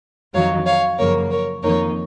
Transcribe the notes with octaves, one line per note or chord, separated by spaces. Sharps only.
F2 D#3 F#3 C#5 F5
C#5 F5
F#2 C#3 F3 A#3 A#4 C#5
A#4 C#5
F2 D#3 A#3 D#4 A#4 C#5